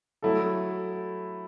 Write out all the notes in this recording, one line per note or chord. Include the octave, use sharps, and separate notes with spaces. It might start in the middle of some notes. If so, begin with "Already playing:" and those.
F#3 A3 E4 A4